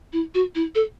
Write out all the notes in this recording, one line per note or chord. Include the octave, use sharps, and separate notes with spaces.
E4
F#4
E4
A4